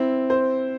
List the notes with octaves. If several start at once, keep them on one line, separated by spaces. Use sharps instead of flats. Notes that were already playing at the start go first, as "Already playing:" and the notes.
Already playing: C4 E4
C5